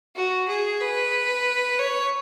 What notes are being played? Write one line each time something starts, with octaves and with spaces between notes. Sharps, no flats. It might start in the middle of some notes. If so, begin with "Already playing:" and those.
F#4
G#4
B4
C#5